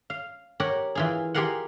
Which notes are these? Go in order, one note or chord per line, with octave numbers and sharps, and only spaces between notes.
F5
G4 A#4 C#5 F#5
E3 F4 G#4
F4 G4 G#4 A#4 F5 F#5